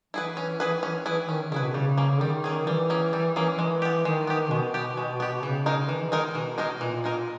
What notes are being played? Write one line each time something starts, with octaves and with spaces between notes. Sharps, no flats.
E3 E4 G#4 B4
C#4
E4 G#4 B4
C#4
E4 G#4 B4
D#3 C#4
C#3 E4 G#4 B4
B2
C#3 G3
A#3 C#4 G#4
D#3 G3
A#3 C#4 G#4
E3 G3
A#3 C#4 G#4
G3
A#3 C#4 G#4
E3 G#3
B3 G4
D#3 G#3
B3 G4
B2 G#3
B3 G4
G#3
B3 G4
C#3 E3
G#3 D#4 A#4 D#5
D#3 E3
E3
D#3 G#3 D#4 A#4 D#5
B2 E3
G#3 D#4 A#4 D#5
A#2 E3
G#3 D#4 A#4 D#5